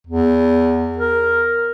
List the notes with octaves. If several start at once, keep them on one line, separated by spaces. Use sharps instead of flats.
E2
A#4